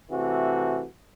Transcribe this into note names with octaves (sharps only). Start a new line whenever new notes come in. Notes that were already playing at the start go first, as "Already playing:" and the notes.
C3 E3 A3 F#4